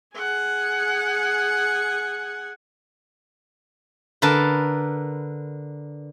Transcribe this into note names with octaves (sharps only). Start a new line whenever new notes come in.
G#4 F#5
D3 A#4 B4 A5